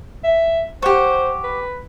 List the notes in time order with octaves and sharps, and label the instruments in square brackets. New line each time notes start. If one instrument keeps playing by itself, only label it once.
[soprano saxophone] E5
[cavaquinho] G4 F#5 C#6 [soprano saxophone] C5
[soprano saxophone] B4